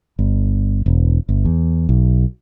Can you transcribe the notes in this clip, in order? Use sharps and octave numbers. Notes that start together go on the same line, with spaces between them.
G1
E1
G1
E2
B1